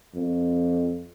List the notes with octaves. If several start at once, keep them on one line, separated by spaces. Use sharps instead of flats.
F2